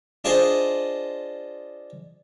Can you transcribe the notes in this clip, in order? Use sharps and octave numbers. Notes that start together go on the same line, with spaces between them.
D4 F4 G#4 C5 D#5